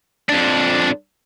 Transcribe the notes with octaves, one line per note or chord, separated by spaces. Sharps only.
F2 D4